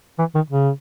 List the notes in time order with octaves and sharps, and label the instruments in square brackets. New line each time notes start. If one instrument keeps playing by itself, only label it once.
[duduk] E3
D#3
C#3